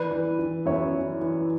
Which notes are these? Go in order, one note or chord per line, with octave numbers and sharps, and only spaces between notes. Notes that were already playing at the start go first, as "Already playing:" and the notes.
Already playing: E3 B4 D5
E3
E3
F#2 C#5 E5
E3
E3